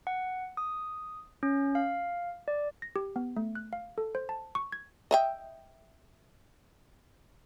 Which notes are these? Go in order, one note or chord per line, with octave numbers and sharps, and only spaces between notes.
F#5
D#6
C#4
F5
D5
A#6
G4
B3
A3
F#6
F5
A4
C5
A5
C#6
G#6
D#5 E5 G5